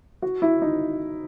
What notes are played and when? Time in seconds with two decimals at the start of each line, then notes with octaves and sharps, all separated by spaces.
0.22 F#4
0.42 E4
0.62 D#4